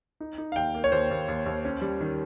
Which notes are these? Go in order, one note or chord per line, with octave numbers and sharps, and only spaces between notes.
D#4
D#4
F5
D#2 G5
A#3
C#5
D#2 C5
D#2
D#2
D#2
C#4
G3
D#3